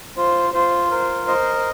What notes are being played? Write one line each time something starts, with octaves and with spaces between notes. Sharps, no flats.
F4 C5
F4 C5
A#4 C5
C5 D#5